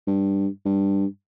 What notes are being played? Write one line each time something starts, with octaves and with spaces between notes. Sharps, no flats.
G2
G2